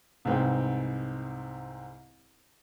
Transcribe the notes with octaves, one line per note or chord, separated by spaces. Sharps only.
C2 G#2 C4 B4 G5